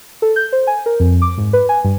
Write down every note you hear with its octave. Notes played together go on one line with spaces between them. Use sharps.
A4
G6
C5
G#5
A#4
F2
D6
G#2
B4
G#5
G2